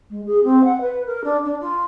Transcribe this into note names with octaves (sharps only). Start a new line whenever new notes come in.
G#3
G#4
C4
F#5
B4
A#4
D4
D4
F4